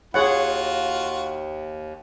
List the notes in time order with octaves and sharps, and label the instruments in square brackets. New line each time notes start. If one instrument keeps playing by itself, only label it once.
[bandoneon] D#2 [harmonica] F4 F#4 [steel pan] G#4 C#5 F#5